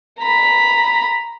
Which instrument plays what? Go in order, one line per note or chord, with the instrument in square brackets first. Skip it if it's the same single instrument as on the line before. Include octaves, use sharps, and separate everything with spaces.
[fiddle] A#5 B5